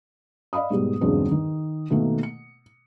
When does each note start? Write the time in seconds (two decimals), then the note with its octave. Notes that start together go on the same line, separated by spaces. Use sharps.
0.53 D5 D#5 F5 B5 D#6
0.70 G#2 B2 G3
1.01 E2 G2 C#3 F#3 G#3 C4
1.31 D#3
1.90 B2 D#3 A3 A#3
2.23 C#7